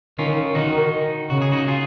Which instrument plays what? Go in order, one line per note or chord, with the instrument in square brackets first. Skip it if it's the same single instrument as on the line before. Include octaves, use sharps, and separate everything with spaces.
[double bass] D#3 [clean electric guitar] C#4 F4
[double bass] D#3 [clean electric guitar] D#4 F#4
[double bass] C#3 [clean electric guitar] F#4
[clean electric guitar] G#4
D#4 F#4
F4 G#4